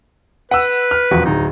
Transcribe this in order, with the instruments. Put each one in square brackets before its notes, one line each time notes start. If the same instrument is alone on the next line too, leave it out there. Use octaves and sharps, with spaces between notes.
[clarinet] B4 [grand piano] F#5 E6
[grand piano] F6
E1 F2 F#4
[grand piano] D1 [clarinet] D#4